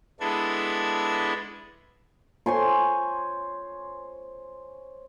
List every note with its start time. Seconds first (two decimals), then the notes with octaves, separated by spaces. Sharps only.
0.20 G#3 B3 D4 E4 A4 G#6
2.46 C5 C#5 G#5 C6